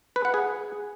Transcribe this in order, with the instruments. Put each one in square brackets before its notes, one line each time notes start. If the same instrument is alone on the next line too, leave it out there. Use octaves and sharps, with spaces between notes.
[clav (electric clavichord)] B4
F#5
G#4